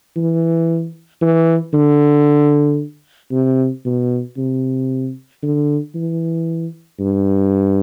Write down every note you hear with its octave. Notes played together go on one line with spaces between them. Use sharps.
E3
E3
D3
C3
B2
C3
D3
E3
G2